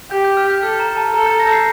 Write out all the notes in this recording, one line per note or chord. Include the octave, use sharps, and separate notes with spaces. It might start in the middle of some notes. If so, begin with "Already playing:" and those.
G4 G6
G6
F6
G6
A4 F6
A#5
A5
A5
A4 A#5
G6
A#6
C7